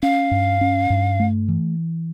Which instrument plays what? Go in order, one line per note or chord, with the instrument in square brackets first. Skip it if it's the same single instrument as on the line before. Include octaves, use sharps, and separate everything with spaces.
[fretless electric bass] C#4 [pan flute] F5
[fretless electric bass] G2
C#4
G2
A3
E3